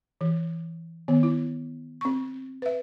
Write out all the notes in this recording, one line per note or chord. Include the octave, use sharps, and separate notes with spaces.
E3
D#3 B3
E4
C4 C#6
B4 E5